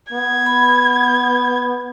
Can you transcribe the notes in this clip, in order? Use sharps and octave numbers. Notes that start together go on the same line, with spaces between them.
B3 G#6
B5